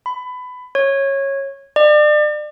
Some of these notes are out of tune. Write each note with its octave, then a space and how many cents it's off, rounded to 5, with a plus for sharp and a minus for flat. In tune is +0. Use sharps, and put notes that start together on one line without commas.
B5 +20
C#5 -15
D5 +35